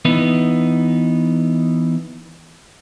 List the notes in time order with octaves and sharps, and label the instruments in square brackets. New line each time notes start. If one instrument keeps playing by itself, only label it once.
[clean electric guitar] E3 B3 D#4